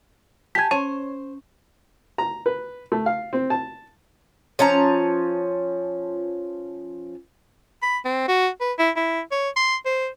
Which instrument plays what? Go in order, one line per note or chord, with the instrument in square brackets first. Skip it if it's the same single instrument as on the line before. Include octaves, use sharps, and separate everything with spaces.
[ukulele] G4 G#5 [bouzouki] A5 [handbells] G#6 B6
[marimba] C#4 [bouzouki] C5 [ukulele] C#5 [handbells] A5
[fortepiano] A#5
B4
A3
F5
C4
A5
[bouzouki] F3 C#4 A5 A#5
[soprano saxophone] B5
C4
F#4
B4
E4
E4
C#5
C6
C5